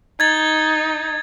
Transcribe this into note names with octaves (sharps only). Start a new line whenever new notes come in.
D#4 G#6 A6